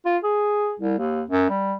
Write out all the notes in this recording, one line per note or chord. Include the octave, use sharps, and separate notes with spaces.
F4
G#4
C2
D#2
F#2
G3